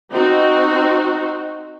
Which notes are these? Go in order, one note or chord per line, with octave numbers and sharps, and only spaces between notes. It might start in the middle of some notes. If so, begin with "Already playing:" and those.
C4 D#4 F#4